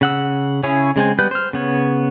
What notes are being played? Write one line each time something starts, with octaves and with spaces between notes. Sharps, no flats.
C#3 F#5 E6
C#3 C#4 E4 G#4 C#5
C#3 G#3 C4 G#5
G3 B3 B4 F#6 G6
C5 F6
C#3 B3 C#5